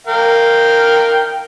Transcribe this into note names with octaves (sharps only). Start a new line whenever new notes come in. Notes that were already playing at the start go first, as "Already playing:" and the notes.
A#4 F5 G5